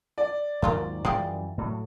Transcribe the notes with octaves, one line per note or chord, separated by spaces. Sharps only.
D5
D#2 G#2 F3 F#3 F4 A#4
F#2 E3 G3 G#3 F4 G4
A2 F#3